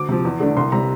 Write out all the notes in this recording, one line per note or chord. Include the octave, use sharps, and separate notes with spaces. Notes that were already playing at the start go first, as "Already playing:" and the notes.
Already playing: D2 D6
C3 F3
E2
D3 A3 D4
C2 C6
C3 G3 A#5